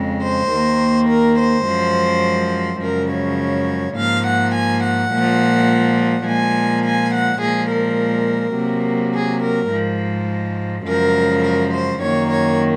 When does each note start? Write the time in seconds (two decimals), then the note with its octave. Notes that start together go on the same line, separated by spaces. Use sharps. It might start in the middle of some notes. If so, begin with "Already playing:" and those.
Already playing: F2 C#3 G#3
0.21 C5
0.50 D#2 D#3 A#3
1.08 A#4
1.37 C5
1.65 F#2 F3 G#3
2.81 F#2 C#3 F3 G#3 A#4
3.10 C#5
3.95 G#2 F3 A#3 F5
4.25 F#5
4.54 G#5
4.82 F#5
5.11 A#2 F3 G#3
6.25 A#2 F3 G#3 G#5
6.83 G#5
7.13 F#5
7.40 A#2 F3 G#3 G#4
7.69 A#4
8.56 C3 F#3 A#3
9.13 G#4
9.42 A#4
9.70 G#2 F3 G#3
10.85 F#2 C#3 F3 G#3 A#4
11.43 A#4
11.73 C5
12.01 F#2 D#3 A#3 C#5
12.30 C#5